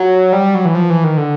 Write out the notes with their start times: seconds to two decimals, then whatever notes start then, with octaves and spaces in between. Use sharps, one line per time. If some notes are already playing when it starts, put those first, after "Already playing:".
Already playing: F#3
0.33 G3
0.55 F#3
0.65 E3
0.75 F3
0.90 E3
1.04 D#3
1.17 D3